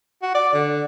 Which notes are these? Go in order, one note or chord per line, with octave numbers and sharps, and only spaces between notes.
F#4
D5
D3